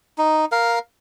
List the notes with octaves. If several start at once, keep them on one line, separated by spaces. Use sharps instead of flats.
D#4
A#4 F5